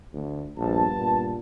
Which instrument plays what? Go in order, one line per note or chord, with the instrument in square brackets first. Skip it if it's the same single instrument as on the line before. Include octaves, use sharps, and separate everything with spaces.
[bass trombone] D2
[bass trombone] A#1 [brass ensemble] G2 B3 A5
[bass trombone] A#2